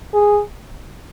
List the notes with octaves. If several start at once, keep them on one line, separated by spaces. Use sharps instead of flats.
G#4